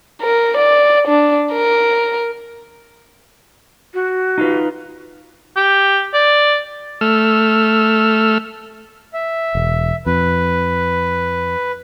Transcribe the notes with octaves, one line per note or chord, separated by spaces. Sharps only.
A#4
D5
D4
A#4
F#4
D#4 F4 B4
G4
D5
A3 E6 F6
E5
E1
F2 B4